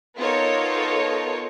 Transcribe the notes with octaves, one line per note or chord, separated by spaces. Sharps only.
B3 D#4 F4 A4 A#4 C#5